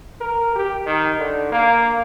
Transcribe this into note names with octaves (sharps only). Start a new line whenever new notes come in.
A#4
G4
D#3
D3
A#3